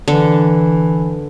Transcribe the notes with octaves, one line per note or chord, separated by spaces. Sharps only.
D3 E3